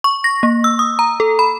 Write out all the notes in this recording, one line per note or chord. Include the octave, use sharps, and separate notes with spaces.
C#6
A#6
A#3
E6
D#6
A#5
A4
B5